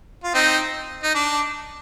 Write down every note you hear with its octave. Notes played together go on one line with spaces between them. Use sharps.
F4
C4 D#4
D#4
D4